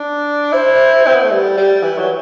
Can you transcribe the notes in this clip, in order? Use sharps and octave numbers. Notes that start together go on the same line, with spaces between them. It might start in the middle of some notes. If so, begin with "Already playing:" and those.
Already playing: D4
E4 C5
C4
B3
A3
G3
G3
E3
F#3